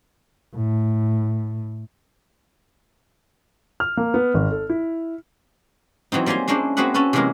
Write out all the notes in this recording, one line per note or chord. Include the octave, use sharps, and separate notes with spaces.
A2
F6
A#3
B3
G#1
A4
E4
E3 F#3 C4 D#4
G3 A#3 G#5 A#5 C6
G#3 A#3 C#4 D4 E4 C5
A#3 C4 F#4 G#4 B4 F#5
C#4 F#4 A4 B4
C3 E3 F#3 G#3 A#3 A#4